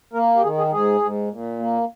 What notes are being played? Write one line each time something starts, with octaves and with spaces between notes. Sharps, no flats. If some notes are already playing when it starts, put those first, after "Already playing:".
A#3 A#4
G4
D#3 G#4
G#4
G#2 G#4
G#2
A#2
A#3